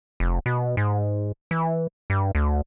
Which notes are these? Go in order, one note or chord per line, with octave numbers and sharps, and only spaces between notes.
F1
B2
G#2
E3
G2
D2